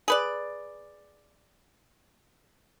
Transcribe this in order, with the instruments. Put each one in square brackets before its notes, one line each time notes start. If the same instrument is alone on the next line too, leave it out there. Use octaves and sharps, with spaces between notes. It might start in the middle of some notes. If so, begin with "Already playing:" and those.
[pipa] G#4 B4 D5